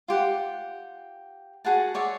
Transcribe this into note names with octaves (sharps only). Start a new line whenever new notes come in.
F4 G4 F#5
F#4 G#4 F#5 A5
G#4 C#5 D5 E5